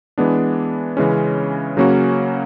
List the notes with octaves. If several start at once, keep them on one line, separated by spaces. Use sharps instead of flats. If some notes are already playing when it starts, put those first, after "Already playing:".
E3 G#3 B3 D4
C#3 E3 G#3 C#4
C#3 F#3 A#3 C#4 F#4